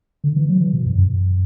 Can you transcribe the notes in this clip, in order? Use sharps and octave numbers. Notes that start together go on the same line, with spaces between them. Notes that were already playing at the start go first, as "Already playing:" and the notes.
D3
E3
F#3
E3
B2
F#2
F#2